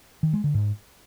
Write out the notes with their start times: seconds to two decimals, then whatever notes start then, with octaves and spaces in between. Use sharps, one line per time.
0.23 D#3
0.33 G#3
0.44 D3
0.54 G#2